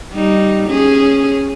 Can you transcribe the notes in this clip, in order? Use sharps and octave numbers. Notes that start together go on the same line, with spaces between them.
G3 D#4
C#4 G#4